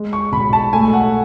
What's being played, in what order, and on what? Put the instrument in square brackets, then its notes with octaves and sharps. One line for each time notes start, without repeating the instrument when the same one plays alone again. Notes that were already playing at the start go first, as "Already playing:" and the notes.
Already playing: [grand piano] G#3
[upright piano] C#6
[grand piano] B1 [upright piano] B5
[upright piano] A5
[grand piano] A3 [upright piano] G#5
[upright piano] F#5